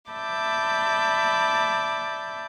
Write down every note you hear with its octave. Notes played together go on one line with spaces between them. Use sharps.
D5 E5 A5 B5 D6 G6